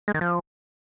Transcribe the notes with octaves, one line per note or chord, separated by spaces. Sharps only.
G#3
D#3
F3